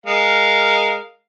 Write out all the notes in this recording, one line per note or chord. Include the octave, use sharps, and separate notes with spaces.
G#3 A#4 F5